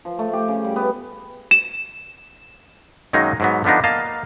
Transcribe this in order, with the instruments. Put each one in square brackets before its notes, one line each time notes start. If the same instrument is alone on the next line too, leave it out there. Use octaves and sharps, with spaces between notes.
[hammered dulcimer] F3
A3
G4
C#3
G3
B3
[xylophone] E7
[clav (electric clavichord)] F#2 D#3 F#3 G#3 A#3 D#4
G#2 F#3 B3
D3 F3 B3 D4 D#4
A#3 D#5 F5 A5